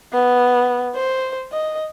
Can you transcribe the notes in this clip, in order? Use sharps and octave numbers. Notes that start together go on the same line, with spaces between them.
B3
C5
D#5